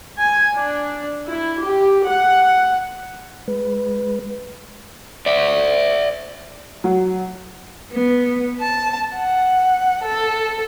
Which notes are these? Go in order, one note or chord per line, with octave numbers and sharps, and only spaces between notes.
G#5
D4
E4
G4
F#5
G#3 B4
D5 E5
F#3
B3
A5
F#5
A4